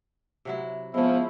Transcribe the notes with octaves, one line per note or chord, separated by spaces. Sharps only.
C3 F#3 E4
F3 G#3 B3 C#4 E4